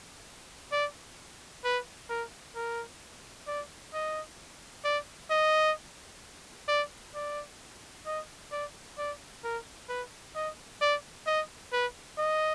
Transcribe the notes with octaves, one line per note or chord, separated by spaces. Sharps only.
D5
B4
A#4
A#4
D5
D#5
D5
D#5
D5
D5
D#5
D5
D5
A#4
B4
D#5
D5
D#5
B4
D#5